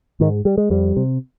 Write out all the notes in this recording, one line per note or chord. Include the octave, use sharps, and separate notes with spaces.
G#2 D#3
G3
G#3
F2 G3
C3